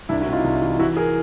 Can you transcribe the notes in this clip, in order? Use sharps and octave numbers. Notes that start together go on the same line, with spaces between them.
C2 D4 E4
E4 F#4
C3
D#4 F4
C2
E3
E3 E4 F#4
G#4 A#4